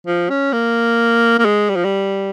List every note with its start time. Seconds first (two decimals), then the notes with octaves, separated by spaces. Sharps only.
0.07 F3
0.30 C#4
0.53 A#3
1.39 A#3
1.45 G#3
1.69 G3
1.76 F3
1.84 G3